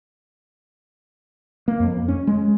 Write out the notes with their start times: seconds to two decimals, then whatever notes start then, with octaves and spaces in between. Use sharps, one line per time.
1.68 A#3
1.80 F2
2.08 C#4
2.27 G#3